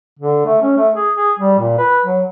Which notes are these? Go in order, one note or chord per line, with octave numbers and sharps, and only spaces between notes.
D3
A3
C#4
A3
G#4
G#4
G3
A#2
B4
F#3